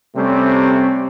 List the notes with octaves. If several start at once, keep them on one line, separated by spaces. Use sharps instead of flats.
C3 G3 A3 C4 C#4